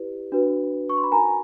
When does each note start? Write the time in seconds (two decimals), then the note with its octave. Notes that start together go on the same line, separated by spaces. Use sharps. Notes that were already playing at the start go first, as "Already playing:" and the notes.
Already playing: E4 G4 B4 D5
0.32 D4 F#4 B4
0.89 C#6
0.97 C6
1.04 B5
1.11 D#4 F#4 A#4 G#5 A#5